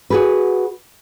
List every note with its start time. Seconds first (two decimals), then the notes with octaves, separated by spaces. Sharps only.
0.10 F#4 G#4 B4